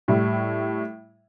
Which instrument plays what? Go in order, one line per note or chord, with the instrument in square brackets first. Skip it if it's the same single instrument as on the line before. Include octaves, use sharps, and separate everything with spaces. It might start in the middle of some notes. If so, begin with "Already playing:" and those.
[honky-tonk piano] A2 G3 E4